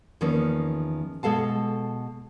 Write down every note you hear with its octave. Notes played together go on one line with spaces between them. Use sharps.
E2 D#3 F3 A#3 C#4
B2 G#3 A4 F5 A5